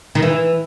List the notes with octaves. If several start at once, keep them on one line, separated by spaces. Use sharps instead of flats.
D#3
E3